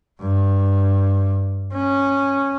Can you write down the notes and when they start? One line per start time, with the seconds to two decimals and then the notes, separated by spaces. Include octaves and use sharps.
0.21 G2
1.74 C#4